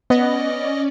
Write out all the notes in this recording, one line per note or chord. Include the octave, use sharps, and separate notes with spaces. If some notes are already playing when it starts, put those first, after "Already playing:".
B3 C#4 D5 D#5